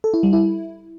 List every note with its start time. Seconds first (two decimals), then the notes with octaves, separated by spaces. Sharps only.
0.04 A4
0.14 E4
0.23 G3
0.33 E4